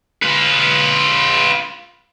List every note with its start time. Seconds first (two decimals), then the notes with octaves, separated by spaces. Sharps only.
0.23 F4 B4